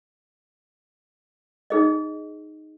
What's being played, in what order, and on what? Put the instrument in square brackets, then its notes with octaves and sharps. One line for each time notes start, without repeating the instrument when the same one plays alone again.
[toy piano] D#4 G#4 D#5